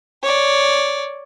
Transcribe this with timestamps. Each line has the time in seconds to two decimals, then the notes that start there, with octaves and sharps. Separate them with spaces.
0.23 C#5 D5